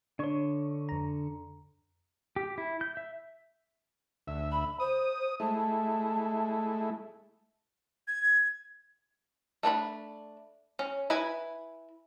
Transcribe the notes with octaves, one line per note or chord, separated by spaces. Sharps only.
D3 D4 C#5 C#6
F2 A#5
G4
E4
G6
E5
D2 E5
B5
C5 D#6
G#3 A3 E4 A5
G#6
A3 D4 C#5 B5
C#4
E4 B4 G#5 B5